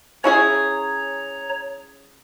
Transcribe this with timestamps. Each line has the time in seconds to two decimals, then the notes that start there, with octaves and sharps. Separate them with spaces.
0.24 C#4 E4 G#4 C#5 A#5